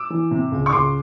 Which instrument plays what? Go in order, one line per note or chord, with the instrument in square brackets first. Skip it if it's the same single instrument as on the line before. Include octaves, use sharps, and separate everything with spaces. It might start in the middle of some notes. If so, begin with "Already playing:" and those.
Already playing: [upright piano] D6 E6
E3
C3
C#2
C#6
C#2 C6 D6